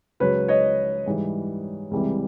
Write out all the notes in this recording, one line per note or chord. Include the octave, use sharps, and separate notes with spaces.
C#2 C#3 F#3 B4 C#5
C#5 D#5
G#2 E3 G3
C#2 C3 E3 G3